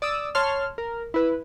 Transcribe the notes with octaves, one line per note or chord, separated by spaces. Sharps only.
D5 D#6 E6
C#5 A5 C6 F6
A#4
E4 B4